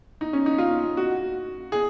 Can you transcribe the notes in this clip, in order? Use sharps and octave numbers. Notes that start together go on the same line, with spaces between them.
D#4
C#4
D#4
F4
F#4
G#4